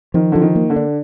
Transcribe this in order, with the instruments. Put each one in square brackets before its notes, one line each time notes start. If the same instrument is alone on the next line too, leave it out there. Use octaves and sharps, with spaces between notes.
[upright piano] D#3 [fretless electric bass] F3
[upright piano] D3 [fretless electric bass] F3
[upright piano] D#3
[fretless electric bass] A#3
[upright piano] D3
[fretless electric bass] D4